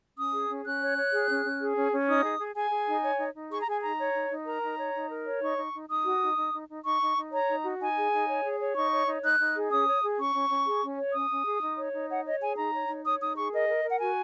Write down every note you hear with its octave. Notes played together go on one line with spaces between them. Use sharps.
C#4 D#6
G#4
C#4
C#4 F#6
C#5
C#5
G#4
C#4
C#4
G#4
C#4
C#4
D#4 D#6
G#4
G#4
G#4 G#5
G#4
D#4
C#5
D#4
D#4
G#4 C#6
A#5
G#4 G#5
D#4 A#5
C#5
D#4
D#4
A#4 A#5
D#4
C#5
D#4
A#4
C#5
D#4 C#6
D#4
D#4
D#4 D#6
F#4
D#4
D#4
D#4
D#4
D#4 C#6
D#4
D#4
C#5 A#5
D#4
F#4
D#4 G#5
G#4
D#4
C#5
G#4
C#5
D#4 C#6
C#5
D#4
D#4 F#6
D#4
G#4
C#4 D#6
C#5
G#4
C#4 C#6
C#4
C#4
G#4
C#4
C#5
C#4 D#6
C#4
G#4
D#4
C#5
D#4
C#5 F#5
C#5 D#5
G#4 G#5
D#4 A#5
C#5
D#4
C#5 D#6
D#4 D#6
G#4 C#6
A#4 D#5
A#4
A#4
F#5
F#4 G#5